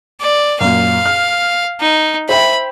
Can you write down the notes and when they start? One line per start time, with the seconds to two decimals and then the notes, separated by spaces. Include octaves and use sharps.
0.21 D5
0.61 F#2 A#2 F5
1.05 F6
1.81 D#4
2.29 C5 E5 G5 B5